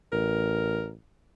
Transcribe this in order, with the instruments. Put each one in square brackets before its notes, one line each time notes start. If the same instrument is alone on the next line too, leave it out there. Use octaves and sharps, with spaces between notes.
[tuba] A1 [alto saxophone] A#4